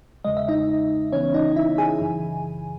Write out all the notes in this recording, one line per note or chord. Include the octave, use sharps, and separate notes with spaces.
E2 C#3 G#3 D#5
E5
D#4 D#5
C#3 E3 B3 C#4 C#5
D#4 D#5
E4 E5
G#4 G#5
F#2 C#3 E3